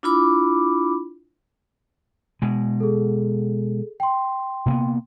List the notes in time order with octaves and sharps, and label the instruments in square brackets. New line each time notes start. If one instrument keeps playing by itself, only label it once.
[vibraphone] D4 E4 F4 B5 D6
[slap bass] B2 G#3
[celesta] G#4 A4
G5 C6
[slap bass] C3 A#3 B3